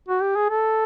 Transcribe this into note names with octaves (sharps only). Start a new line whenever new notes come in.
F#4
G4
G#4
A4